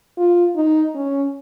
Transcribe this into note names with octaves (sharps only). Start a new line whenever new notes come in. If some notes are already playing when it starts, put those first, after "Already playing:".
F4
D#4
C#4